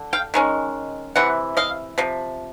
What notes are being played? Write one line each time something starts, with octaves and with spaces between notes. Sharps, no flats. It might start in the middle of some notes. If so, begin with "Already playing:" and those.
Already playing: D3
F5 G5
D#3 G#3 C#4
C3 E3 F#5
D#5 F5
C3 F3